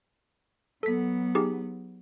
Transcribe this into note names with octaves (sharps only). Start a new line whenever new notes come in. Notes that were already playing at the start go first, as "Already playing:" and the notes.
F#3 B3 A4 B6
D#4 G4 G#4